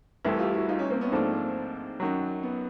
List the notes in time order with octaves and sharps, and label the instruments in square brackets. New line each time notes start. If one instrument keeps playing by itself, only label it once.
[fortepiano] C2 C3 E3 A3
[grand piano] F4 G4
E4 F#4
D#4 F4
C#4 D#4
A#3 C4
B3 C#4
[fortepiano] G#2 F3 A3 D4 [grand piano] A#3 C4
[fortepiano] F#2 D#3 F#3
[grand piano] B3